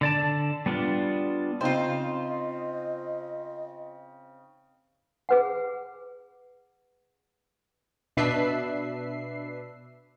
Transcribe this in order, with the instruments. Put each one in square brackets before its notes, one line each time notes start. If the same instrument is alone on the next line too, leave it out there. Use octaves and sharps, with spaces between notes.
[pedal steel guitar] D3 D5 A5
G3 B3 D4 F4
[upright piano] C#3 C4 D#4 [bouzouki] F4 C5 [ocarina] D#5
[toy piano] G#4 B4 F#5
[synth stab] B2 D4 B4 E5 C7